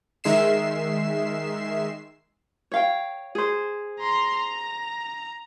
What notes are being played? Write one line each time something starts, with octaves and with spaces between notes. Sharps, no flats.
D#3 G#3 E5 C7 E7
C#5 F5 G5
G#4 C5
A#5 C6
A#5